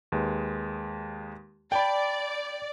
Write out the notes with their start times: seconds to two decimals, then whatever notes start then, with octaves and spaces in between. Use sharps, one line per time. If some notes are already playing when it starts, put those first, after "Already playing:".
0.12 D#2 G#3 B4
1.72 D5 G5 A5 B5